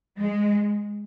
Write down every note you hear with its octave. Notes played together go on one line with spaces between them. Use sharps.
G#3